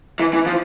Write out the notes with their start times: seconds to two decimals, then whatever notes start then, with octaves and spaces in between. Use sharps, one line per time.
0.20 E3
0.33 E3
0.46 F3